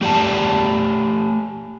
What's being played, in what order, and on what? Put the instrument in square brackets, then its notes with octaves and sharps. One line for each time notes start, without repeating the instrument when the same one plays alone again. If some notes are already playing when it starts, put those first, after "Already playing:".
[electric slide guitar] A3 G4 D5 F5 A5